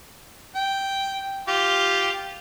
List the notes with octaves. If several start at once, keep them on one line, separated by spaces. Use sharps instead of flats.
G5
F4 G4